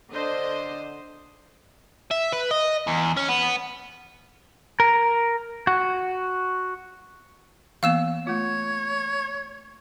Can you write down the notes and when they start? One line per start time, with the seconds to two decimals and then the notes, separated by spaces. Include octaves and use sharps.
0.13 D3 C5 D#5
2.11 E5
2.33 B4
2.51 D#5
2.87 E2
3.17 C#4
3.28 B3
4.80 A#4
5.67 F#4
7.83 E3 A#3 B3 F5 E6 E7
8.27 A3 F4 C#5